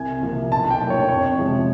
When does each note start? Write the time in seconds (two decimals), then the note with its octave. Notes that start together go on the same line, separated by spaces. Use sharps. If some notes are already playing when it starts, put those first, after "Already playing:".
Already playing: C2 G#5
0.22 C3 F3 A#3
0.51 B1 A5
0.70 G5
0.80 A2 F#3 A#3 D4
0.90 C#5
1.09 F2 C#5
1.38 C3 F3 G#3 C#4